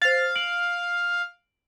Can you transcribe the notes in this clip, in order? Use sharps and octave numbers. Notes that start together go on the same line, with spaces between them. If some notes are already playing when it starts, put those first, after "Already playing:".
C5 F5 A6
D7 F#7